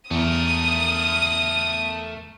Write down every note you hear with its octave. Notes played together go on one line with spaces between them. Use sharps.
E2 A3 A#4 D#6